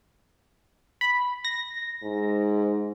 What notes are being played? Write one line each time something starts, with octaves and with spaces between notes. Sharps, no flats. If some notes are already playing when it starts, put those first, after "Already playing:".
B5
A#6
G#2